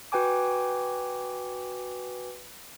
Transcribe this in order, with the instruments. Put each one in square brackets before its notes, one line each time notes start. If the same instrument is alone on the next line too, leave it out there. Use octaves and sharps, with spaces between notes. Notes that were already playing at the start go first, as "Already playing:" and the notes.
[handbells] F#4 B4 G5 G#5 D6